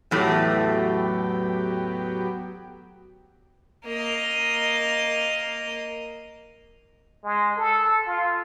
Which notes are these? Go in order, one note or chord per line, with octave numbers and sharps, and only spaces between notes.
E2 A2 F#3 A3 B3 G4
A#3 D#5
G#3
A4
F4